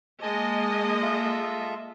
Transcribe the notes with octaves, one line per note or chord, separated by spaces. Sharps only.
G#3 A#3 D#5 G#5 A5
F4 A4 E5